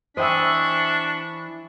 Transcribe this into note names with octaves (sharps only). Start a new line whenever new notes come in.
E3 D4 C5 D#5 G5 B5 C#6 E6